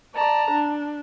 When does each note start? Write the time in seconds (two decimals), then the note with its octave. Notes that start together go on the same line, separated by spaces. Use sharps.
0.15 D5 A5 A#5
0.52 D4